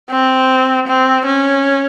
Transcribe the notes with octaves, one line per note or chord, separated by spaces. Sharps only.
C4
C4
C#4